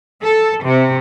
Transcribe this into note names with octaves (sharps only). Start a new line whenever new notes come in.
A4
C3